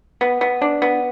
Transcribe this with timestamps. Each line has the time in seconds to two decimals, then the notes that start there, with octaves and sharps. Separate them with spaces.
0.21 B3
0.41 B3
0.62 D4
0.82 B3